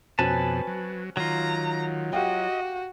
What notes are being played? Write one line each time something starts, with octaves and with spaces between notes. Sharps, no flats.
F2 B2 C4 C#4 F#4 B4 G#5 A5
F#3
D#3 F#3 F4 A#5
F#4 G4 D#5 F5 G5